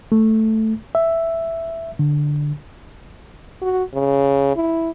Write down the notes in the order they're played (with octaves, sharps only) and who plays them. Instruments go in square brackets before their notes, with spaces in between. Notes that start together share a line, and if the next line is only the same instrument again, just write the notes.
[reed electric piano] A3
E5
D3
[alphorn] F#4
C#3
E4